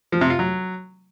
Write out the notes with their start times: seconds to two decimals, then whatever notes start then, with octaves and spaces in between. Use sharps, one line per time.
0.12 F3
0.21 C3
0.30 F4
0.39 F#3